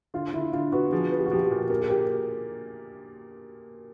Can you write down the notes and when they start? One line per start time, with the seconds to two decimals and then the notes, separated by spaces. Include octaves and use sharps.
0.14 D3 F4
0.33 D3 E4
0.53 D3 F4
0.72 B3 F#4
0.92 F3 G#4
1.11 B3
1.18 G4
1.26 F#4
1.31 F3 G4
1.44 G4
1.51 A#2
1.70 A#3 G4
1.81 G#4
1.89 A#3 G4